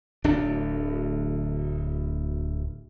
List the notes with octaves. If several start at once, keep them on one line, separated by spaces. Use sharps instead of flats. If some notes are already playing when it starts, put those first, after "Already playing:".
D1 D2 D4